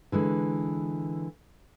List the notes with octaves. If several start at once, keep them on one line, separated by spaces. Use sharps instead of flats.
D3 E3 G#3